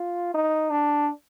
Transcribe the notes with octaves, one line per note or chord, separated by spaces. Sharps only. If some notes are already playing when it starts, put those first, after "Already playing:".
Already playing: F4
D#4
D4